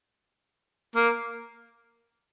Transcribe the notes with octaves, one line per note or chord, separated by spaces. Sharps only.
A#3